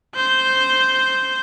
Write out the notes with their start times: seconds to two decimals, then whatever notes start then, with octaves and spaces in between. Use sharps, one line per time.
0.16 C5 G6